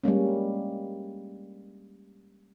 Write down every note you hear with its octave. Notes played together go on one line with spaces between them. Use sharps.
G3 G#3 A#3 C#4